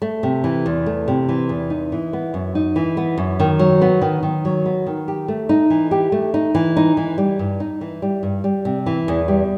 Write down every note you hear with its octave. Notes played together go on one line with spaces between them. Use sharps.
A3
C3
E3
E2
A3
C3
E3
E2
D#4
E3
B3
F#2
D#4
E3
B3
F#2
D#3
F#3
B3
D#3
D#3
F#3
B3
D#3
G4
A3
D#4
E3
G4
A3
D#4
E3
D#4
E3
G3
G2
D#4
E3
G3
G2
G3
C3
E3
E2
G3